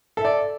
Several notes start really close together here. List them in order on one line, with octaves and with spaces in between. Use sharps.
A4 E5 D5